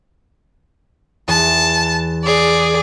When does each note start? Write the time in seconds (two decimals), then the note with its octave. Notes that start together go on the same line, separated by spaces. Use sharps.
1.28 E2 A5
2.25 G#4 D5